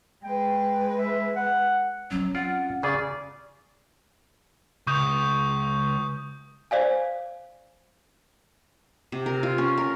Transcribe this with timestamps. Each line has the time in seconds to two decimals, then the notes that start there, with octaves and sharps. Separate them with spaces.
0.24 G#3 B4 G5
0.97 E5
1.36 F#5
2.11 F#3 C4 C#4
2.35 F4 D5 F#5
2.83 C#3 G#4 D5
4.87 C#2 C#6 D#6 G6
6.71 C5 D5 F5 G#5
9.12 C3
9.26 A#4
9.43 F4
9.58 C#4
9.77 A#4